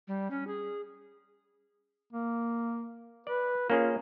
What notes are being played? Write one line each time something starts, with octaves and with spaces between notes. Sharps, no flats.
G3
C#4
G#4
A#3
B4 D5
A#3 C#4 F4 G#4